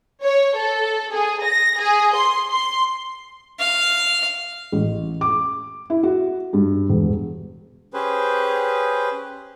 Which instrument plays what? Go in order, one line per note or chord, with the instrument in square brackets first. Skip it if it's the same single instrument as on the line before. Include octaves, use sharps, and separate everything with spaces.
[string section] C#5
A4
G#4
A#6
G#4
C6
C6
[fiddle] F5
[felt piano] A1
D6
E4
F#4
G2
E1
[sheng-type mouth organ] C#4 G4 G#4 B4 C5